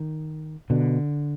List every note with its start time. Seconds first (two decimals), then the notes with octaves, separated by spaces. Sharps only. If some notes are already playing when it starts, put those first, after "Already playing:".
Already playing: D#3
0.70 B2 D3